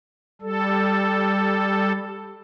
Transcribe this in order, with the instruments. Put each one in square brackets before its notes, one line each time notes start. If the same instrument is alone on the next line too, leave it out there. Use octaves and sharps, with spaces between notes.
[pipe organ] G3 A4